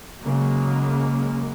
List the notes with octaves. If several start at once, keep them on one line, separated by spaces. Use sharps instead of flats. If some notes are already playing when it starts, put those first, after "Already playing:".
F#2 C#3 F#3 G#3 A#3